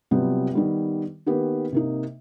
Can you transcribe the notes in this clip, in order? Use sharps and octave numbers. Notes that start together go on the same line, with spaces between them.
C3 F#3 G3 B3 C4 F4
D#3 G3 B3
D#3 A#3 B3 G4 B4
C3 A#3 D#4